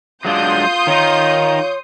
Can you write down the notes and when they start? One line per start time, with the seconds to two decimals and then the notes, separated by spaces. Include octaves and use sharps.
0.25 F#3 G#3 D4 F4 C6 D#6 G6
0.87 D#3 D#4 C#5